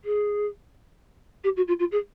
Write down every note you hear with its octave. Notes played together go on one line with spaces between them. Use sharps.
G#4
G4
F#4
F4
F4
G#4